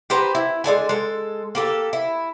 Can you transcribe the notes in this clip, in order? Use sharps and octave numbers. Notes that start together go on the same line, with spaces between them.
G4 B4 C5 A#5
E4
G#3 D4 A4 G#5
G#3 A4
A#3 G4 A4
E4